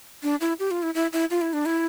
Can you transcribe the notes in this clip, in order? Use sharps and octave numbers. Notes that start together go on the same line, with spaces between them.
D4
E4
G4
F4
E4
E4
E4
F4
E4
D4
E4